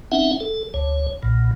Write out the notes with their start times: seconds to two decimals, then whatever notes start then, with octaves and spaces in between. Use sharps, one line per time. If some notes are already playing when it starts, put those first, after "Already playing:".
0.12 C4 C#4 D#4 E5 F#5
0.40 A4
0.74 D2 C#5
1.23 B1 A#2